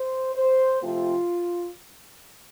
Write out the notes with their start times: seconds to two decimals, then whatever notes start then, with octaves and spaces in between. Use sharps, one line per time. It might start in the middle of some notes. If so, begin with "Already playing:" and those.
Already playing: C5
0.34 C5
0.81 C3 F3 A3 C4 F4